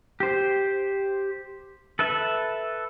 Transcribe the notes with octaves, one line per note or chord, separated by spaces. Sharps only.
G4 C5
A4 B4 E5